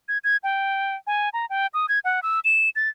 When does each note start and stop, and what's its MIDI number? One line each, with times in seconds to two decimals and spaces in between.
0.08 0.18 92
0.24 0.37 92
0.43 0.96 79
1.07 1.29 80
1.33 1.46 82
1.50 1.67 79
1.74 1.86 87
1.89 1.99 92
2.05 2.20 78
2.23 2.40 88
2.45 2.69 100
2.76 2.89 93